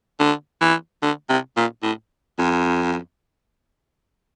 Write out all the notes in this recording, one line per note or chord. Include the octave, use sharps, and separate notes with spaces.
D3
E3
D3
C3
A#2
A2
F2